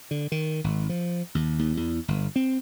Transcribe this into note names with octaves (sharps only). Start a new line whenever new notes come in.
D3
D#3
G#1
F3
D#2
D#2
E2
G1
C4